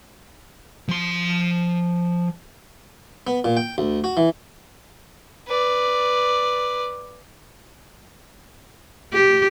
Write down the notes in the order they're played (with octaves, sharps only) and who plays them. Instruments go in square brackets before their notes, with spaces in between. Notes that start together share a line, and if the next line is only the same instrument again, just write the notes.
[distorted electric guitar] F3 C6
[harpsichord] B3
A#2
G5
D2
F#4
E3
[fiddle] B4 D5
[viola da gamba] G4